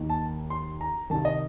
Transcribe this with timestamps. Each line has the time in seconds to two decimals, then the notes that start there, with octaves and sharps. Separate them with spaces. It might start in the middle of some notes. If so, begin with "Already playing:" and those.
Already playing: D#2 D#3 A#3 D#4
0.10 A5
0.50 C6
0.81 A#5
1.10 C2 C3 D#3 A5
1.25 D#5